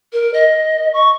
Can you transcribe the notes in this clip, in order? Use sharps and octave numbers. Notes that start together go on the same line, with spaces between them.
A#4
D#5
C#6